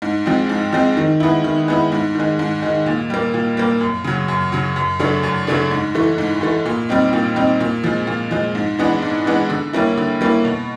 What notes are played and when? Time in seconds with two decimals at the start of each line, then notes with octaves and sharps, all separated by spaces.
0.02 G#2
0.26 F3 G#3 C4
0.49 G#2
0.73 F3 G#3 C4
0.97 D#3
1.20 G#3 B3 E4
1.44 D#3
1.68 G#3 B3 E4
1.92 G#2
2.15 D#3 G#3
2.39 G#2
2.62 D#3 G#3
2.86 A#2
3.10 G3 A#3
3.34 A#2
3.57 G3 A#3
3.81 F#2
4.04 C#3 F#3
4.28 F#2
4.52 C#3 F#3
4.76 F#2
4.99 C#3 F#3 A3 D4
5.23 F#2
5.47 C#3 F#3 A3 D4
5.71 G#2
5.95 E3 A3
6.18 G#2
6.41 E3 A3
6.66 A#2
6.89 G3 C4 D#4
7.13 A#2
7.36 G3 C4 D#4
7.60 A#2
7.84 F3 G#3
8.07 A#2
8.31 F3 G#3
8.55 G#2
8.79 E3 G#3 B3 D4
9.02 G#2
9.26 E3 G#3 B3 D4
9.50 D3
9.73 G3 A#3 C#4 E4
9.97 D3
10.21 G3 A#3 C#4 E4
10.45 B2